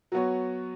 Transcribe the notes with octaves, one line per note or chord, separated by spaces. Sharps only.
F#3 B3 F#4 C#5